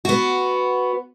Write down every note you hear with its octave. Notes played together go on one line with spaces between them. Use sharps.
B3 F#4